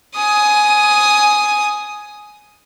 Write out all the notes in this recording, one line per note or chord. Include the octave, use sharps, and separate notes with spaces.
G#5 D#6